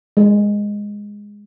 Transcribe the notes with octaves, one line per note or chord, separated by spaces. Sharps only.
G#3